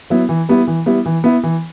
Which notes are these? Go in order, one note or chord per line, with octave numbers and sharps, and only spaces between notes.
F#3 B3 E4
E3
G3 B3 E4
E3
G3 B3 E4
E3
B3 E4
E3